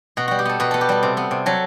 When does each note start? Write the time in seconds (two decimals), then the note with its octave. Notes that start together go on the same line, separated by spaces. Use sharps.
0.17 B2 F#4
0.28 G3 F#4
0.39 G4
0.45 B3 A4
0.60 B2 B4
0.71 B3 A4
0.81 G4
0.89 G3 A4
1.03 C3
1.17 B3
1.31 C3
1.46 F#3 A4